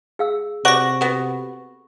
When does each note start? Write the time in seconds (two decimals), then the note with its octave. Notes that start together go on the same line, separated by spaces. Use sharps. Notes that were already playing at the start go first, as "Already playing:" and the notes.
0.19 G#4 F5 E6
0.65 C3 F#4 D5 F#5 C#6 A#6
1.01 B3 F#4 A4